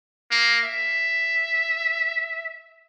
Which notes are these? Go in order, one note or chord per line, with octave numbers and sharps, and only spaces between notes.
A#3
E5